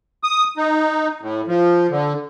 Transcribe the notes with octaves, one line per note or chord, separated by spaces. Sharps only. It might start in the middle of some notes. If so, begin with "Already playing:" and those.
D#6
D#4
A2
F3
D3